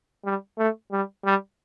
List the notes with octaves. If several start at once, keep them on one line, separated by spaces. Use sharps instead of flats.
G3
A3
G3
G3